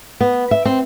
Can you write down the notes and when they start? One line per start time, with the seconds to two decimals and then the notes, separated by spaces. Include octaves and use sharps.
0.21 B3
0.51 E5
0.65 C4